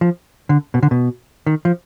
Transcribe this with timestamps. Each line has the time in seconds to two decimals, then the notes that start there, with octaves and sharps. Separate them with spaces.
0.01 F3
0.49 D3
0.74 B2
0.83 D3
0.91 B2
1.46 D#3
1.65 F3